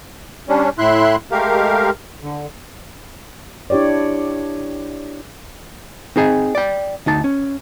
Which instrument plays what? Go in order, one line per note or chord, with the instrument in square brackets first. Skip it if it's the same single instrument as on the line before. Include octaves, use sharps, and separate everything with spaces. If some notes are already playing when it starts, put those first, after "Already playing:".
[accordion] G3 C#4 D4
A2 E4 E5 C6 F#6
G#3 A3 G4 A#4 F5
D3
[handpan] D4 E4 G4 C#5 D5
[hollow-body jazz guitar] C4 D#4 G#4 G#5
D5 G5
D2 D#4 A5
C#4